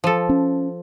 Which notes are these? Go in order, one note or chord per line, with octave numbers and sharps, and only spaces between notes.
F3 A4
C#4